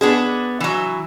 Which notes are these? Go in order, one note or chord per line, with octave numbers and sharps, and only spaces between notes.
B3 D4 G#4
E3 F#3